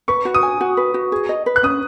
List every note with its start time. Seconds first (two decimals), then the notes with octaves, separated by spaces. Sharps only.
0.08 B4 C#6
0.25 F#4
0.35 D#6
0.43 G#5
0.61 F#4
0.77 B4
0.94 F#4
1.12 G#4
1.29 D#5
1.46 B4
1.56 F#6
1.63 C#4 D#6